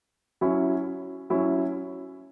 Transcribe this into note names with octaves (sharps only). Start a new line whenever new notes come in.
F#3 C#4 E4
F#3 C#4 E4